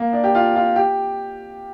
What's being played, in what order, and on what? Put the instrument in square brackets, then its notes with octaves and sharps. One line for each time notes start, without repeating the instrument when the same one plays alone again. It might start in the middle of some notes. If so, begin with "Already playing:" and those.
Already playing: [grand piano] A#3
D4
G4
F4
F4
G4